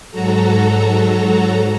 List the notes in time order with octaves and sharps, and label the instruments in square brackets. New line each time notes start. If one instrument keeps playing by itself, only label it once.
[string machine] G#2 F#3 F#4 A4 A#5